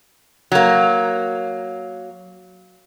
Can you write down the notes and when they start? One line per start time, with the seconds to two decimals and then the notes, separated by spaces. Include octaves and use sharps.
0.52 F#3 A#3